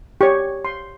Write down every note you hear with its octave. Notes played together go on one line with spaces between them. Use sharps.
G4 C#5 C#6
C6